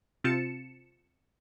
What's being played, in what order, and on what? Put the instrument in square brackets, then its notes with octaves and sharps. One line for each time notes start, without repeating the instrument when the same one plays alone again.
[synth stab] C3 C4 F4 A5 C#7 E7